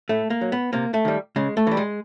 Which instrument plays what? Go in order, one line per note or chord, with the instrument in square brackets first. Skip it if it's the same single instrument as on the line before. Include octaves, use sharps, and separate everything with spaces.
[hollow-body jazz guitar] A2 A3
A#3
F#3
B3
C3 A#3
A3
D#3 G3
C#3 G#3
A3
E3 G3
G#3